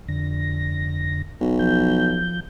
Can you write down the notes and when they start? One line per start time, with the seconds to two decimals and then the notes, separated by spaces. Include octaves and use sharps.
0.08 F2 D3 A#6
1.41 B1
1.59 F3 G6